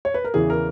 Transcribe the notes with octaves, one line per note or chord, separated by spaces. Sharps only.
C#5
B4
A#4
E2 C#3 E3 G#4
A#4